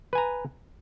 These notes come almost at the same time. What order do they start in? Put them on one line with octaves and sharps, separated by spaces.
B4 G#5 A#5